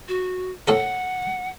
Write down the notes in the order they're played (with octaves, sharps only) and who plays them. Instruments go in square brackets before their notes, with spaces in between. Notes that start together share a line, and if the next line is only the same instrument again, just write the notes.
[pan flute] F#4
[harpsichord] A2 A4 A#4 [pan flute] F#5